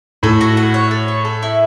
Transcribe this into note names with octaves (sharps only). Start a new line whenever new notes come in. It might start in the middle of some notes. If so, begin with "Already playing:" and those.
A2 A4
F#4
F#5
C#5
A4
C#5
A4
E4